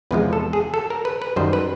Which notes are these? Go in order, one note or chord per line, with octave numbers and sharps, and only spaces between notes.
E2 C3 F3 G#3 B4
A4
G#4
A4
A#4
B4
B4
F#2 D#3 G3 C5
B4